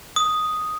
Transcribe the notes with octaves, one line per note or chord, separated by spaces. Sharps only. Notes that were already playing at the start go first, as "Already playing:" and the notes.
D#6